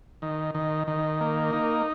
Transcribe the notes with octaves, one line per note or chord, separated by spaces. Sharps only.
D#3
D#3
D#3
A#3
D#4